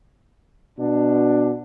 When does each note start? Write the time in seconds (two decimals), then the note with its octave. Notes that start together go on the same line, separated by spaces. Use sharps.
0.79 B2 D4